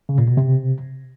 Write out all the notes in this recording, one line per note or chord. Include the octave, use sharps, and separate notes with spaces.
C#3
A#2
B2
C3